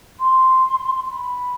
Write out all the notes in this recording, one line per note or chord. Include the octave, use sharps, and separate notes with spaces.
C6
B5